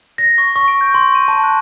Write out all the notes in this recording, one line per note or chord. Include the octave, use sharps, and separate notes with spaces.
A#6
C#6
C#6
D7
G6
C6
D#7
A5
F#6